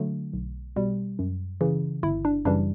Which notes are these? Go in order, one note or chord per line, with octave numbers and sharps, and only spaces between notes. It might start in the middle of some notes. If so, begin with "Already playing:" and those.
Already playing: D3 F#3 A3
B1
B2 G3
F#2
C#3 E3
G1 E4
D4
F#2 C#3 E3 G3 D4